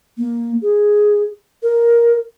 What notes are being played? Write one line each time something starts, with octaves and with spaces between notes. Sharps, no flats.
A#3
G#4
A#4